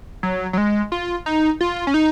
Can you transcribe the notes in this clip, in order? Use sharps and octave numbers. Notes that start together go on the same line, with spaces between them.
F#3
F#3
G#3
F4
D#4
F4
C#4
D#4